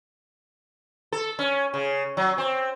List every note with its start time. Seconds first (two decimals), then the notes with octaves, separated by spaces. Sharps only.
1.12 A4
1.39 C#4
1.74 C#3
2.17 F#3
2.38 C4